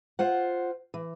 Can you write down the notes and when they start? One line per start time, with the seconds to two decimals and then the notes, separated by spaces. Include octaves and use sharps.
0.19 F4 C5 F#5
0.94 E3